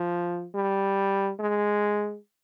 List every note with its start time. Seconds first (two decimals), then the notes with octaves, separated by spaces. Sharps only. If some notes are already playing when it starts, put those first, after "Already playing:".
Already playing: F3
0.54 G3
1.40 G#3